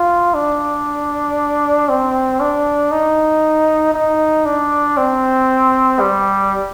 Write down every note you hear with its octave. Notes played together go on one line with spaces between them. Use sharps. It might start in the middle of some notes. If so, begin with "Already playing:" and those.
Already playing: F4
D4
C4
D4
D#4
D#4
D4
C4
G3